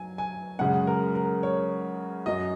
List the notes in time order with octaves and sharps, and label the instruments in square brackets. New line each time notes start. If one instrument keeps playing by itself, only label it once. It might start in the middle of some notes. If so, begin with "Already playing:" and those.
Already playing: [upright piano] F#3 G#5
G#5
F#2 C#3 G#3 F#5
A#4
A#4
C#5
F#2 F#3 D#5